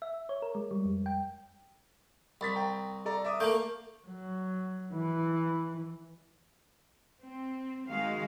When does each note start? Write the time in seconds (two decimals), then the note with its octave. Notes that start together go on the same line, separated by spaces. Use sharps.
0.02 E5
0.29 C#5
0.42 A#4
0.55 G#3
0.71 G3
0.85 F2
1.06 G5
2.41 C2 B5 A6 B6
2.54 G5 A#5
3.05 A4 D5 A#5
3.24 E5 D6 D#6
3.40 A3 A#3 F5 G6 D7
4.08 F#3
4.93 E3
7.24 C4
7.88 D#3 G#3 F#4 F5